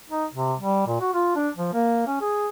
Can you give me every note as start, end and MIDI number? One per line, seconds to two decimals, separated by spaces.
0.10 0.25 63
0.34 0.54 48
0.60 0.83 55
0.87 0.99 46
1.00 1.12 66
1.13 1.33 65
1.36 1.49 62
1.57 1.73 53
1.73 2.06 58
2.07 2.20 61
2.21 2.48 68